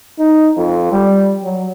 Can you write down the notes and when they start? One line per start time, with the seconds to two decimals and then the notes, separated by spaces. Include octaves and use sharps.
0.19 D#4
0.57 F2
0.92 G3
1.44 F#3